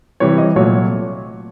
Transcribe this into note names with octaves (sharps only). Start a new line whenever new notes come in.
C3 E3 G3 C#5
D#5
A#2 F#3 A3 C#5